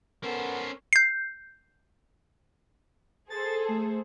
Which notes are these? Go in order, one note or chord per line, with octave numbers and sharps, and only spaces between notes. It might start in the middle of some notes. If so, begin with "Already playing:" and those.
B3 C#4 A4 A#4 C5
G6 C7
G#4 A4 C5 A6
A3